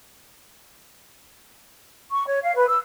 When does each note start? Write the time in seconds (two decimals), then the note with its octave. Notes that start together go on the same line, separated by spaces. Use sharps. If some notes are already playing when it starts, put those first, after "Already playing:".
2.12 C#6
2.27 C#5
2.44 F5
2.55 B4
2.68 E6